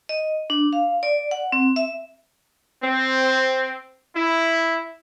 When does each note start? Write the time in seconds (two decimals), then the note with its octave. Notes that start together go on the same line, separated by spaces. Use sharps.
0.09 D#5
0.50 D4
0.73 F5
1.03 D5
1.31 F#5
1.52 C4
1.76 E5
2.82 C4
4.16 E4